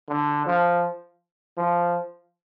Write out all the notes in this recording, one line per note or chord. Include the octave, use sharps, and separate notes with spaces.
D3
F3
F3